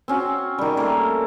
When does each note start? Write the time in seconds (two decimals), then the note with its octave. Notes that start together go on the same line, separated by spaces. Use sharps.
0.08 C4 C#4 F#4
0.58 D#3 G3
0.77 A3 A#3